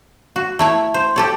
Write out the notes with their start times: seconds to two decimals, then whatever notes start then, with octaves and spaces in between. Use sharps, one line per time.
0.36 F#4
0.59 A3 E4 C#5
0.94 C5
1.16 G4 A4 C#5